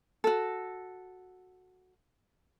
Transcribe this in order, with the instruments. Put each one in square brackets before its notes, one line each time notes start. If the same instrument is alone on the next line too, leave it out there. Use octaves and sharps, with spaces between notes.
[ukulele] F#4 A4